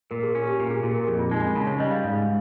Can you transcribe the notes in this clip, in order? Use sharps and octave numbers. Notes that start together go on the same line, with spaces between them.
A#2 A#4
G#4
C#4
G4
A#2
G#4
A#2 G#4
A#4
F2 G#4
F4
G#3 D#4
C#4
C#3 F4
C#5
G3 D#5
F5
G#2